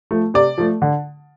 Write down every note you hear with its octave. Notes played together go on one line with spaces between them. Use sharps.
F3 A3
C3 D5
F3 A3
D3